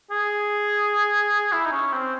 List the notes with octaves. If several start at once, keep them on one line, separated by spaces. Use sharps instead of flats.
G#4
E4
D#4
C#4
C4